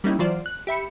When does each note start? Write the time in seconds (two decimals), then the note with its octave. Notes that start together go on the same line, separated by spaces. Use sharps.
0.04 G3 A#3 C#4 D#4 E4
0.19 E3 F#3 F4 C5 D5
0.46 F#6
0.67 G4 E5 B5 C#7